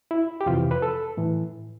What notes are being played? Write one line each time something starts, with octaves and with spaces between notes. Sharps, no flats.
E4
G4
F2 C3 E3 F4
B4
A4
A2 E3